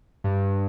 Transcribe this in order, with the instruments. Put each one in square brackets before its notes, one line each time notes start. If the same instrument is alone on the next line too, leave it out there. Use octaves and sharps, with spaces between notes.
[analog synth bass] G2